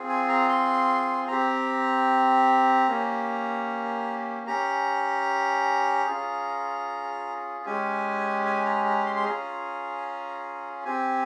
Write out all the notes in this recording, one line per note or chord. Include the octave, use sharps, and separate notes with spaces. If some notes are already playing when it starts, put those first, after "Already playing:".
Already playing: C4 F4 G#4
G#5
A#5
C6
C4 G4 A#5
A#3 C#4 G4
C#4 G4 A#5
C#4 F4 G#4
G#3 C#4 G4 G#5
G#5
A#5
A#5
C6
C6
C#4 F4 G#4 A#5
C4 G4 G#5